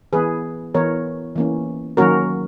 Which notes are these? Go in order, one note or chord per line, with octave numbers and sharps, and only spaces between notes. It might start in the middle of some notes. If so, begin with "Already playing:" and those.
E3 B3 G#4 B4
E3 B3 A#4 C#5
E3 A#3 C#4
D#3 F#3 A#3 C#4 F#4 A#4